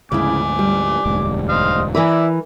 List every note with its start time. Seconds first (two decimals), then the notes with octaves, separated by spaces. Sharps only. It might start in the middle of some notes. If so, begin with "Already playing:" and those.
0.12 D2 G#2 C#3 E4 G#5 D6
0.59 G3
1.06 E1 D2 G#2
1.49 C5 D#5 F5
1.95 E3 E4 A#4 B4 D5